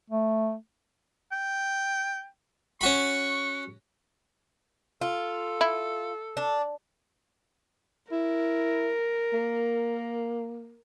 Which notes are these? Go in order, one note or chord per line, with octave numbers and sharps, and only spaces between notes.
A3
G5
C#4 F#4 B5 C#6
F4 A4
E4
D4
E4 A#4
A#3